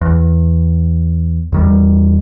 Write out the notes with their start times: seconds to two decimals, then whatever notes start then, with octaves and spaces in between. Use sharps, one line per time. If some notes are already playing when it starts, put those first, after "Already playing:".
0.01 E2
1.52 E2 D#3 G3